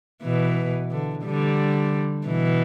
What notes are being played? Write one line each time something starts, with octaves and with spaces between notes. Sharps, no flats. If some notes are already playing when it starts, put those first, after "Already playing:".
B2 E3
D3
D3 G3
B2 E3